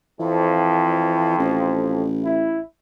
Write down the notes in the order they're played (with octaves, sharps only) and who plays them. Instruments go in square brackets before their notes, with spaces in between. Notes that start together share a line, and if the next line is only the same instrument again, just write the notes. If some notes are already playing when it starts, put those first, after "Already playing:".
[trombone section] F2 [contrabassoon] E3
[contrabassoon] A1
[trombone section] E4